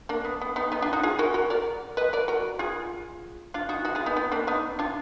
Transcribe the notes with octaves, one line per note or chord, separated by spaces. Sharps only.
A#3 D4
B3
B3
B3 D#4
B3 D#4
D4 F4
D#4 F#4
F4 G#4
F#4 A#4
F#4 A#4
A#4 D5
B4 D#5
A#4 D5
F#4 A#4
F4 G#4
D4 F4
D#4 F#4
D#4 F#4
F4 G#4
B3 D#4
B3 D#4
A#3 D4
B3 D#4
D4 F4